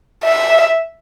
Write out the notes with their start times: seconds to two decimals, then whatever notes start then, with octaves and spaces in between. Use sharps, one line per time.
0.24 E5